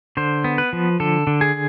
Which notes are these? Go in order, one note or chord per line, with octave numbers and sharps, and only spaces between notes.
D3 C5
B3
B4
F3
D3 A4
D3
G#4